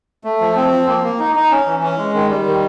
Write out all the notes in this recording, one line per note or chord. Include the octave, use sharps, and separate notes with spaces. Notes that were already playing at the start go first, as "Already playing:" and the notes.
A3
F3
C4
F3
A#3
A#3
D#4
D#4
C#4
E3
C#4
G#3
D#3
G3
D#3